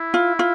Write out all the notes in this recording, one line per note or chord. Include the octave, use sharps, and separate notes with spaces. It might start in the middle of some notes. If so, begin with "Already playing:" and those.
Already playing: E4
F4
F4